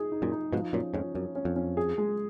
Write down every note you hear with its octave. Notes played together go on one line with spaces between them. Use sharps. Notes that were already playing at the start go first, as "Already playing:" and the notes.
Already playing: D#4 G#4
D#4
F#2 A#2
D#4
G#2 B2 F3
F#2 A#2 C#4
F2 G#2 C#4
F#2 C#4
C#4
F2
C#4
G#4
G#3